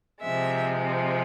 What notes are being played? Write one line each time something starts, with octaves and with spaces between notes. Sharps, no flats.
C3 F3 G#3 E5